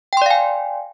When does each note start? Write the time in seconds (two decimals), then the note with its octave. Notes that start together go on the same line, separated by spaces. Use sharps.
0.13 G5
0.17 C6
0.22 D5
0.26 F5
0.31 G#5